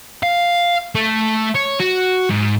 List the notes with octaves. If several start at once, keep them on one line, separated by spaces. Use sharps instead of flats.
F5
A3
C#5
F#4
G#2